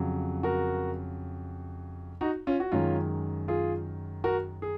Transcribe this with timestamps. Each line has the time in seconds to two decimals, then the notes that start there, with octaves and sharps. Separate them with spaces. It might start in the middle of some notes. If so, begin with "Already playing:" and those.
Already playing: F2 C#3 F#3
0.43 F#4 A#4
2.21 D#4 F#4
2.47 C#4 F4
2.60 F#4
2.72 F#2 D#3 G#3 C#4 F4
3.48 F4 G#4
4.24 F#4 A#4
4.62 G#4